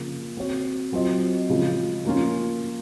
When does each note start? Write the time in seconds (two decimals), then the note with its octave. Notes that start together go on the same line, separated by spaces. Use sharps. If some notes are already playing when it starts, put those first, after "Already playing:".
Already playing: C#3 F3 A#3
0.37 C4 F#4 C#5
0.92 F#3 C4 F4 C5 D#5
1.50 C#3 F3 G#3
2.05 F3 A#3 C#4 F4